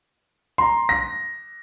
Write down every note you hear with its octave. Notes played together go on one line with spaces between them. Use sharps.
A#5 C6
A#6